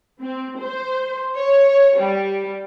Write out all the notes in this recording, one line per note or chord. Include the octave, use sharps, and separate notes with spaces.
C4
C5
C#5
G3